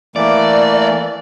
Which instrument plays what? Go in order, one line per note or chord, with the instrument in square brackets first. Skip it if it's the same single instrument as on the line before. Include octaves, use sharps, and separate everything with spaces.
[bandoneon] E3 A3 A#3 [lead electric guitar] D5